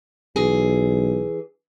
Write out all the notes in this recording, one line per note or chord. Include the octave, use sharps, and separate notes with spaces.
B1 E3 G#4